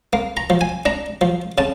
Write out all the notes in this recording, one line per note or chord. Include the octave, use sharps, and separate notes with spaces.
A#3
A#5
F3
G#5
D4 A#5
F3
C#3 A5